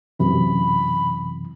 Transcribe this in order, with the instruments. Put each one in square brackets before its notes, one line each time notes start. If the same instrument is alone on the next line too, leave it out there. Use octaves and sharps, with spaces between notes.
[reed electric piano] F#2 C3 E3 [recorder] B5